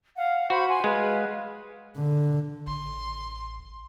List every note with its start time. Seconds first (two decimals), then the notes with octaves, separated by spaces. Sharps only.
0.17 F5 F#5
0.50 F#4 C5 B5 C6
0.68 F#5 G#5 C6
0.84 G#3 B4 F5
1.97 D3
2.67 A1 C6